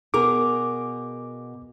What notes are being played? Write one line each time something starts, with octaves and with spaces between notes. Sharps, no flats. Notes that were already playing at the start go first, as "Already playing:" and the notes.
B2 G#4 A#4 D6